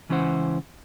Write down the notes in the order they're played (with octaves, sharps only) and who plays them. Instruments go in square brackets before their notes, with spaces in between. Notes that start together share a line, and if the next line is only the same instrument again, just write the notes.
[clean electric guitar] C#2 E3 C#4 E4 C5 F#5